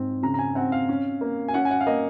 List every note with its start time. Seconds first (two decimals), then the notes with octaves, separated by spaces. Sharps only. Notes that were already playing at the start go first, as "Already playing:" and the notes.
Already playing: G#2 C4
0.23 C#3 A#5
0.34 A#5
0.39 G#5
0.55 C4 F#5
0.72 F5
0.89 C#4
1.21 A#3
1.48 G#5
1.54 C#4 F#5
1.65 G#5
1.71 F#5
1.81 F5
1.87 A#3 D#5